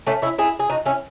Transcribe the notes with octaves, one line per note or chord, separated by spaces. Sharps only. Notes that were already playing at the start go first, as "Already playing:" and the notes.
A3 C#4
C#4 E4
E4 G#4
G#4
D#4 F#4
C#4 E4